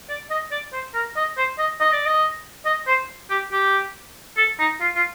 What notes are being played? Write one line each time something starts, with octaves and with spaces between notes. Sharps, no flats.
D5
D#5
D5
C5
A#4
D#5
C5
D#5
D#5
D5
D#5
D#5
C5
G4
G4
A4
D#4
F4
F4